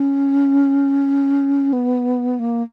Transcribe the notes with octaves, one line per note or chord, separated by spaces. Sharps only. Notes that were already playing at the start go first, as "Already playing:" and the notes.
Already playing: C#4
B3
A#3